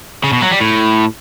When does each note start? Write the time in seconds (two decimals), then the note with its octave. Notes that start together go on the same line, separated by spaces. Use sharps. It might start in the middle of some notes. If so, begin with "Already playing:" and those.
0.24 C#3
0.33 B2
0.42 F#3
0.51 G3
0.60 A2